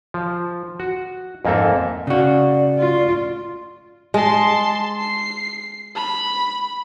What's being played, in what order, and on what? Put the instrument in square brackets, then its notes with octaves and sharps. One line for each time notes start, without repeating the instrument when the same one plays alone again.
[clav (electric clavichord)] F3
F#4
F2 G#2 A#3 C4 A4 E5
[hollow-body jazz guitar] C#3 F#4 [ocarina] D5
[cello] F4
[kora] G#3 [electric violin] A5 C6
[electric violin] C7
B5